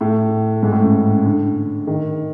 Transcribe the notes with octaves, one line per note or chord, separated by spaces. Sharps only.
A2
G#2
A2
C#3
D3
D#3